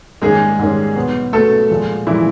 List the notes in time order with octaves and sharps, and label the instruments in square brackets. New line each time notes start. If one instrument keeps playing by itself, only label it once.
[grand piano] G#2 D#3 G3 A#3 C#4 [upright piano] G#3 G#4
[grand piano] G#2 D#3 G3 A#3 C#4
B2 F#3 B3
[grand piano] B2 F#3 B3 [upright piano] A3 A4
[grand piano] A#2 F3 G#3
[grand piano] A#2 F3 G#3 [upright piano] E3 E4